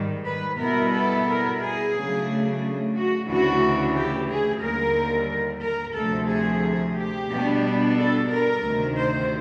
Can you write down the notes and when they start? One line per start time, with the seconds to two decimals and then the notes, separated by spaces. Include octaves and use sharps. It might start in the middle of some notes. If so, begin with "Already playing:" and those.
Already playing: G#2 D#3 G3
0.26 B4
0.59 B2 G3 B3 E4 A#4
0.94 A4
1.27 A#4
1.61 G#4
1.93 C#3 F#3 A3 D4
2.94 F#4
3.27 D2 C#3 E3 A3 D4 F#4
3.95 G4
4.27 G#4
4.61 D#2 D3 G3 A#4
5.62 A#4
5.95 D2 C3 F3 A3 A4
6.29 G#4
6.96 G4
7.29 B2 G3 B3 D4
7.97 A4
8.30 A#4
8.63 D2 C3 D#3
8.98 C5